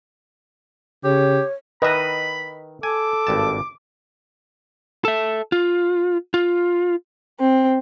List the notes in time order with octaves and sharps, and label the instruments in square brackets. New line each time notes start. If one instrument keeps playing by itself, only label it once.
[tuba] C#3 [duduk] G4 [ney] C#5
[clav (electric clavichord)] D#3 E5 [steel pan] B4 D#5 [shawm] B5
[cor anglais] A4 [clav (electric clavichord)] G#5 [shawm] D6
[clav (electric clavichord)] G#1 G2 A5
[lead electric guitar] A4 E5
F4
F4
[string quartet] C4